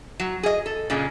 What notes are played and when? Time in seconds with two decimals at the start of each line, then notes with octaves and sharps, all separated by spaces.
0.20 F#3
0.43 G#4 D#5
0.66 A4
0.90 A#2 C#3 G#3